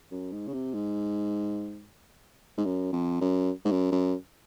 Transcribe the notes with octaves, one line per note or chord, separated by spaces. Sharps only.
F#2
G#2
C#3
C3
G#2
G#2
F#2
F2
F#2
G#2
F#2
F#2